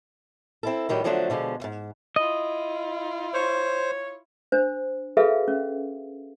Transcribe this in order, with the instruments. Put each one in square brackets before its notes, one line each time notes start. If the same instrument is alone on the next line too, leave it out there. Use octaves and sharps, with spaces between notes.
[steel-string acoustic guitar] C4 E4 A4
A2 D#3 F#3 G3
D3 F3 F#3 A3 D4 C5
B2 D3 F3 G#3
D2 G#2
[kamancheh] E4 F4 [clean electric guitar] D#5
[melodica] C5 [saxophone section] C#5
[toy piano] D4 C5
F#4 G#4 A4 B4 E5 F5
C#4